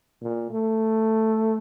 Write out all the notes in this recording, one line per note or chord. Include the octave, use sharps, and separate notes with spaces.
A#2
A3